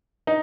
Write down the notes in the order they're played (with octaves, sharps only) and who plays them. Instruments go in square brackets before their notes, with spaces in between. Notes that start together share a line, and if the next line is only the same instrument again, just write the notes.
[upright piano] D#4